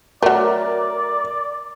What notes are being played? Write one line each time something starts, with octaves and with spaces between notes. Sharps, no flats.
F#3 A3 A#4 D5